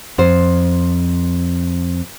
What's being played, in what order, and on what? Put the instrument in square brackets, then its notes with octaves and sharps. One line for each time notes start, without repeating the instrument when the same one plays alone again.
[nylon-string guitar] F2 C5